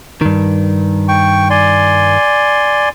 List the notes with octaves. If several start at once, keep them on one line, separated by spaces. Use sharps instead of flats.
G2 D#3
G5 C#6
D5 G#5 C6